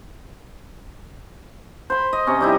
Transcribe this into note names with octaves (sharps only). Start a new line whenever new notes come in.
C5 B5
D#5
C3 C#4
G3 D#4 E4